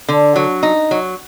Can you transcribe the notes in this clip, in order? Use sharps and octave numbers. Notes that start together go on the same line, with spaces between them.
D3
F#3
D#4
F#3